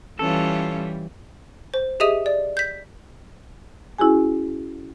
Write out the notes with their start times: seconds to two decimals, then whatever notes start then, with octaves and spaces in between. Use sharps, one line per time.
0.19 E3 G3 C#4 F4 A4
1.74 C5
2.00 G4 G#4 D#5 E5 D#6 D#7
2.26 D5
2.57 G6 B6
3.98 C#4 E4 F#4 G#4 G#5